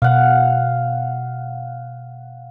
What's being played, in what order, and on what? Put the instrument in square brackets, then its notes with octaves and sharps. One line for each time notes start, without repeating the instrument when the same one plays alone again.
[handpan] B2 [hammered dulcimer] F5 F#5